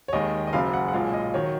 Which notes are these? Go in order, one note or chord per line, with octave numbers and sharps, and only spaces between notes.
C#5
D#2 D#3 G#3 D#5
D#5
F#1 F#2 C#3 F5
F#5
F#5
B1 A#2 G#3 F5
D#5
D#3 F#3 C#5